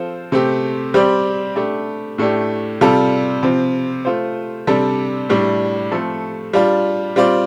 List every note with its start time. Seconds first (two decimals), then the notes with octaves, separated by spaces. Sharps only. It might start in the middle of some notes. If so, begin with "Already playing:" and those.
Already playing: F3 C4 F4 A4 C5
0.32 C3 A3 C4 G4
0.94 G3 C4 G4 D5
1.56 A3 D4 G4
2.18 A2 A3 D4 G4
2.81 C3 G3 F4 A4
3.43 C3 F3 C4
4.05 A3 F4 C5
4.67 C3 G3 D4 A4
5.29 A2 G3 D4
5.91 F3 A3 C4 A4
6.53 G3 D4 F4
7.16 G3 C4 F4 D5